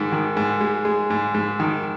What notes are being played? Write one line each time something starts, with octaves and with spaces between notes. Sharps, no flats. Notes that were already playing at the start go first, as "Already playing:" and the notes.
Already playing: G#2 D#3
D#3
G#2
G#3
G#3
G#2
G#2
D#3